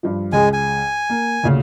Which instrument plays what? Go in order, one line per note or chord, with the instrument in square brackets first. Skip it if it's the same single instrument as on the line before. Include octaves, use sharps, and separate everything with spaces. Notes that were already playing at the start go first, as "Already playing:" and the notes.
[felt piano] G2 F3
[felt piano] C#2 G#4 [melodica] G#3 G#5
[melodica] G#5
[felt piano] A#3
D2 A#2 C#3